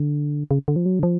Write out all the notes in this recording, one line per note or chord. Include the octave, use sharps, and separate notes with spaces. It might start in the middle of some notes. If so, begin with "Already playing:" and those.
Already playing: D3
C#3
D3
F3
F#3
D3
F3